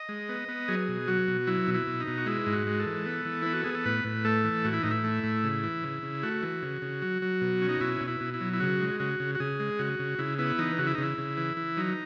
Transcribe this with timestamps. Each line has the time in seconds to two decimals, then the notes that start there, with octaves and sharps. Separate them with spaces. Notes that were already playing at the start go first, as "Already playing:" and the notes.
Already playing: D#5
0.09 G#3
0.29 B3
0.48 B3
0.68 F#3 G#4
0.88 B2
1.08 F#3 F#4
1.28 B2
1.47 F#3 E4
1.68 B2
1.74 E4
1.87 B2
2.00 D#4
2.08 B2
2.17 F#4
2.26 G#3 E4
2.46 G#2
2.53 F#4
2.67 G#3
2.79 A4
2.86 E3
3.06 B3
3.25 E3
3.42 B3 E4
3.53 F#4
3.64 B3 G#4
3.74 A4
3.86 A2 B4
4.05 A2
4.25 A3 A4
4.44 E3
4.65 A2 F#4
4.73 E4
4.83 A2 D#4
4.91 E4
5.04 A3
5.24 A2
5.44 C#3
5.63 E3
5.84 C#3
6.03 C#3
6.23 A3 F#4
6.43 E3
6.63 C#3
6.82 C#3
7.02 F#3
7.22 F#3
7.41 B2
7.62 C#4
7.69 D#4
7.81 B2 E4
8.01 B2
8.08 E4
8.21 B2
8.34 E4
8.41 F#3
8.53 E4
8.60 C#3 F#4
8.80 G#3
9.00 C#3 F#4
9.20 C#3
9.35 F#4
9.40 C#3 G#4
9.60 G#3
9.79 C#3 F#4
9.99 C#3
10.19 C#3 E4
10.39 B3 E4
10.59 E3 D#4
10.78 C#3 F#4
10.87 E4
10.95 D#4
10.98 C#3 E4
11.18 C#3
11.37 E3
11.57 E3
11.77 F#3 D#4